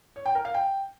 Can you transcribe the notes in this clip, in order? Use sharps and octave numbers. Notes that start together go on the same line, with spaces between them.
C#5
G5
A#4
F5
G5